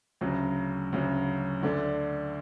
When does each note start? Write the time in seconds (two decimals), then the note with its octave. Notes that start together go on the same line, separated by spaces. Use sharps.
0.21 D2 C#3 F#3
0.93 D2 C#3 F#3
1.63 D2 D3 A3 D4